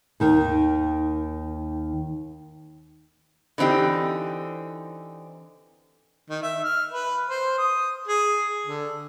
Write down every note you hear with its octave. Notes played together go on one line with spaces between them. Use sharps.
D#2 D#3
D3 E3 C4 D#4 G4
D#3
E5
F6
B4
C5
D#6
G#4
D3